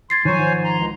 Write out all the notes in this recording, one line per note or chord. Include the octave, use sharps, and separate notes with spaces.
C6 G#6 A6 C7
D#3 F3 F#3 C5 C#5 G#5
G#2
A#5 C6
C#2